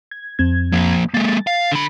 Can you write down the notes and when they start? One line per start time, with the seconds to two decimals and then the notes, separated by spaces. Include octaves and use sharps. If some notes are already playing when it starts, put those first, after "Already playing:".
0.11 G#6
0.39 F2 C4 G#6
0.73 F3 A#3
1.14 G#3 A#3 A6
1.47 F5
1.72 D3 B5